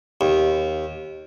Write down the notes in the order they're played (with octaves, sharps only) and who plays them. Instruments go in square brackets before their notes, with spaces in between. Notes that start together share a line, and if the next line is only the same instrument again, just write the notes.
[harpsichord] D#2